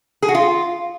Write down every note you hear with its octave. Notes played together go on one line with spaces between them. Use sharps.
G#4
F#4
F4